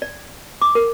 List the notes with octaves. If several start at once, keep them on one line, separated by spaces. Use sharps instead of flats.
D5
D6
A#4